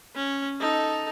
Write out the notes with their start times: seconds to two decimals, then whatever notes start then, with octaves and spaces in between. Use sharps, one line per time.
0.15 C#4
0.60 D#4 A4